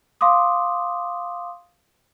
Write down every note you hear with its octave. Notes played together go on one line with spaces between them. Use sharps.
F5 C6 D6 D#6